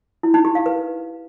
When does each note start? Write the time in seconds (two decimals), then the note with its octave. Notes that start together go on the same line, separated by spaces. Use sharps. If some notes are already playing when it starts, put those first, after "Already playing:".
0.23 E4
0.34 D#4
0.45 G4
0.55 F5
0.66 B4